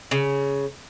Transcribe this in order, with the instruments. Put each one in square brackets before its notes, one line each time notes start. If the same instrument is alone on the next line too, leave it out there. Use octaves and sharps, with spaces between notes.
[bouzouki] C#3